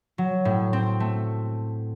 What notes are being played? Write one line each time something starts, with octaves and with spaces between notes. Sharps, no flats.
F#3
A2
C4
A3